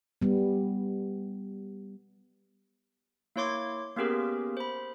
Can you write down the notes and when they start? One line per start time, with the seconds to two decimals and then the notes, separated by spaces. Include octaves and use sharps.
0.22 G3 B3
3.36 A#3 E4 C#5 C6 D6 G#6
3.97 A#3 B3 C#4 G4 G#4 A#4
4.57 C5 B5